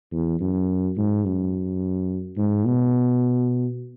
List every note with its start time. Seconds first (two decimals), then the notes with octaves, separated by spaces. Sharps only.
0.12 E2
0.40 F#2
0.97 G#2
1.25 F#2
2.37 G#2
2.66 B2